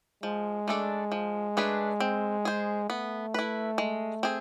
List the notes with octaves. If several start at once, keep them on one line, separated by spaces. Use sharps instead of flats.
F3 G#3
A3 D4 A4 D5
F3
A3 D4 G#4 B4
C4
G#4 C5
A3 B3
E4 B4
G#3
C4 G#4